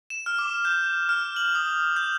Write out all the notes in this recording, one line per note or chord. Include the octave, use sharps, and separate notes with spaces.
E7
F6
D6
G6
F6
F#7
D#6
G6